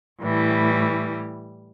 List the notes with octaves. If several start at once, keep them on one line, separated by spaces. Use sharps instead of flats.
A2 E3 G3